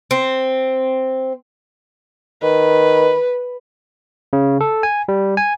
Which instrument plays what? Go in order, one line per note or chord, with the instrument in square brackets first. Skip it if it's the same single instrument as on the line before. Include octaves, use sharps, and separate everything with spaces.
[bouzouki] C4
[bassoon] D#3 [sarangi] B4
[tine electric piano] C#3
A4
G#5
G3
G#5